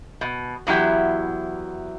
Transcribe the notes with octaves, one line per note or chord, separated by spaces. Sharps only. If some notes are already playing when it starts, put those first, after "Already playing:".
B2
E2 F#3 E4 G4